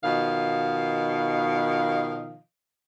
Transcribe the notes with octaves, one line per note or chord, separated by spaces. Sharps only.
B2 D#3 F3 D#5 F5